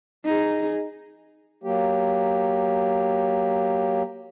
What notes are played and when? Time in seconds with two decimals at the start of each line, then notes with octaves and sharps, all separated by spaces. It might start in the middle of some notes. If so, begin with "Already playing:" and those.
0.24 D#4 G#4
1.64 F#3 A#3 G4